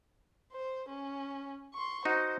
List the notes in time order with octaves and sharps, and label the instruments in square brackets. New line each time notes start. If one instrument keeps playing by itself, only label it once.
[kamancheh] C5
C#4
C6 C#6
[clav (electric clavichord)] D#4 F#4 [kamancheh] C5